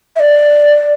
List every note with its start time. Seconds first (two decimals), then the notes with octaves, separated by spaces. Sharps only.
0.16 E5
0.20 D5